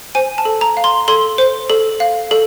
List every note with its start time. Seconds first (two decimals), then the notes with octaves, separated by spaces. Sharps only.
0.15 C5 G#5
0.38 A5
0.45 A4
0.61 A#5
0.77 F5
0.84 C6
1.08 A4 C6
1.38 C5
1.70 A4
2.00 F5
2.31 A4